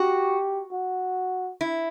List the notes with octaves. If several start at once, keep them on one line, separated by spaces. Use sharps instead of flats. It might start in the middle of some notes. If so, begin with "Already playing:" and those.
Already playing: F#4 G4
F#4
E4